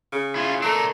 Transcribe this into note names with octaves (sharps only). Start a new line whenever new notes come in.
C#3
E4 F4
A3 D4 A#4